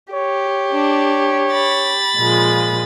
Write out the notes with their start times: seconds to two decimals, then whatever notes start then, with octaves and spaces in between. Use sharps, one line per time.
0.13 G4 C#5
0.72 D4
1.52 B5 A6
2.17 A#2 F3 G#3